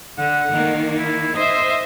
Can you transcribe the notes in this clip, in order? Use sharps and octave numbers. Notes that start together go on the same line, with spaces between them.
D3 F#5
D#3 A#3
E4
C5 D#5 E5